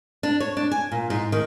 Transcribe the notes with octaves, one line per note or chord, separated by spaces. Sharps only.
D4
C#5
D4
G#5
A#2
G#2
D#3